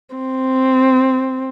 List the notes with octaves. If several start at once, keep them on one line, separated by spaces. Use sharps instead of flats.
C4